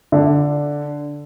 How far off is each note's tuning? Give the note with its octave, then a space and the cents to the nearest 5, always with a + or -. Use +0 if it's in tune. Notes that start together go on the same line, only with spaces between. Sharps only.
D3 -5